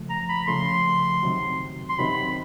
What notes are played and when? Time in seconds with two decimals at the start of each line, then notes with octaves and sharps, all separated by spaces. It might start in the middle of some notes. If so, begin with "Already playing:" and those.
Already playing: C#3 F3 A3
0.10 A#5
0.29 B5
0.48 C#3 F3 A3 C6
1.23 C3 D#3 F#3
1.90 C6
1.98 C3 D#3 F#3 B5